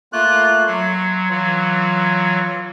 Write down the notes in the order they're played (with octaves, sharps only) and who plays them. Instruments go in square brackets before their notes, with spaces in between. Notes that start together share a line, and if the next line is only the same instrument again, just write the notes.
[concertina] A3 A#3 F#6 [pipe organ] F4
[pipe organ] F#3 [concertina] C6
[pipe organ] E3 F#3 [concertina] F4